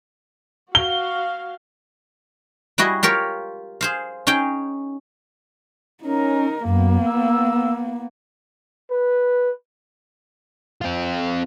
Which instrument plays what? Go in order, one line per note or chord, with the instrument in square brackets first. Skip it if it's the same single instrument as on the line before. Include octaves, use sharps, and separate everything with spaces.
[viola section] F#4 F5 [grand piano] G7
[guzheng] G3 E4 F#4 G#4 D#5
F4 G4 A#4 C#5
G#4 C5 F5
C#4 D#4 G#4 G5
[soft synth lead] C#4 [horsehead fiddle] D#4 A#4
[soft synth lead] F#2 [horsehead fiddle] A#3 B3
[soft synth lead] E6
[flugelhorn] B4
[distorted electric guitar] C4 F4